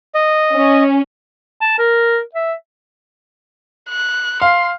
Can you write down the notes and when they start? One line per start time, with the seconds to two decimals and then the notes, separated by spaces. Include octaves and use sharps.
0.15 D#5
0.55 C#4
1.61 A5
1.79 A#4
2.35 E5
3.90 F#6
4.42 F5 C6